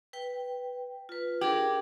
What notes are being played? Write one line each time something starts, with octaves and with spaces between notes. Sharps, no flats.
B4 G5
F4 B4
D4 G4 G#4 A#4